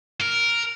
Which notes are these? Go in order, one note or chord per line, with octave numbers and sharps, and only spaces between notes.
A#4